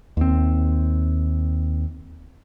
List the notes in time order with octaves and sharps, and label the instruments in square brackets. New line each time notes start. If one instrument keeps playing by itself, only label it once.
[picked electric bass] D#2 C4